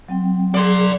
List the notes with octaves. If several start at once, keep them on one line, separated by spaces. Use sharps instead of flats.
F#3 C4 G5
F#3 G#4 D5 C6